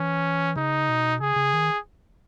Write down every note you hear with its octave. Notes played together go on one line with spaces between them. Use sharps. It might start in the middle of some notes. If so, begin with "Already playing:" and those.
Already playing: E3 C#4
C#3 D#4
B2
C#3 G#4
C#3
D#3